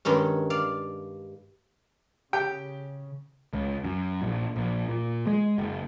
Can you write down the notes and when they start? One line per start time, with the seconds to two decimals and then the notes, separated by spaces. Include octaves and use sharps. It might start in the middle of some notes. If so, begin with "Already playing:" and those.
0.05 G2 D#3 G#3 C#4
0.50 D5 F5
2.33 C#3 G4 G5
3.53 C#2
3.84 F#2
4.22 A#1
4.56 A#1
4.88 A#2
5.27 G#3
5.58 F#1